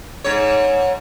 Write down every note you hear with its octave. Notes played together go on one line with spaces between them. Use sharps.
G#2 C#5